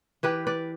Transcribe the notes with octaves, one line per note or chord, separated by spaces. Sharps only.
E3 G4 B4
B4 D5